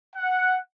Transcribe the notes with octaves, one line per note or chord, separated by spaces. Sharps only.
F#5